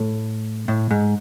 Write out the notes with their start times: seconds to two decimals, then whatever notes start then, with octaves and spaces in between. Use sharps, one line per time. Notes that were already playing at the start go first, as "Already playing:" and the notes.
Already playing: A2
0.68 A2
0.91 G#2